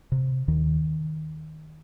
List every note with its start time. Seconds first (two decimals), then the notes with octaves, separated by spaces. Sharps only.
0.12 C3
0.48 D#2 D#3